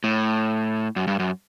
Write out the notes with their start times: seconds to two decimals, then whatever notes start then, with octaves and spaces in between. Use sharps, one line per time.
0.04 A2
0.96 F#2
1.07 G2
1.20 F#2